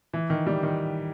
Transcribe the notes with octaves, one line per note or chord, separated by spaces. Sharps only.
E3
D#3
G3
D#3